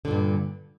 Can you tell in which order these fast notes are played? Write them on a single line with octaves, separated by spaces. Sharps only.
D3 A#2 G2